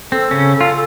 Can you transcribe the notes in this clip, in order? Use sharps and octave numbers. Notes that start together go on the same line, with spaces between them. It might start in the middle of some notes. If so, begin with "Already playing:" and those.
C4 A4
C#3 C#4
F4